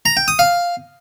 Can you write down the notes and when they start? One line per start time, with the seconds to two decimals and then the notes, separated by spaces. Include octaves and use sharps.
0.06 A#5
0.17 G5
0.28 D#6
0.39 F5